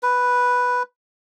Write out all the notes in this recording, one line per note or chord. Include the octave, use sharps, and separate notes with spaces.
B4